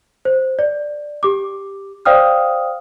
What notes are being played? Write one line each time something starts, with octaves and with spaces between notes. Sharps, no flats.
C5
D5
G4 D6
C5 D5 F5 G5 D#6 F6